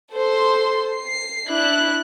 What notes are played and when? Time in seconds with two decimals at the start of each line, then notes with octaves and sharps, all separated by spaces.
0.14 A4 C5 C6
0.94 C7
1.48 D4 E4 F#6